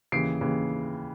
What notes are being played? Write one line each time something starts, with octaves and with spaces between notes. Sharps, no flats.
D#2 C#3 E3 C7 D7
D#2 C#3 E3